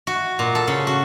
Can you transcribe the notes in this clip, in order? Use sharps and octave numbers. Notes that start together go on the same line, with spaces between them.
F#4
A#2
A4
C#3
F#4